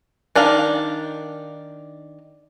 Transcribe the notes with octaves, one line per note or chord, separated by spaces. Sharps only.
D#3 D4 D#4 F5